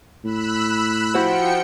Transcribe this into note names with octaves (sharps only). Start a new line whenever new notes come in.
A2 B5 E6 F#6
F3 E4 F#4 C5 G5 C#7